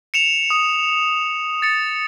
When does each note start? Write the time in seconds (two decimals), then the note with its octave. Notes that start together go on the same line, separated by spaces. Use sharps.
0.14 C#7 E7 F7
0.50 D#6
1.62 A6 C#7